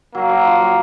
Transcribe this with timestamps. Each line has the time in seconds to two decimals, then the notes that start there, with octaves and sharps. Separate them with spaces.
0.15 F#3 A#3
0.29 F#3
0.44 F3
0.59 F#3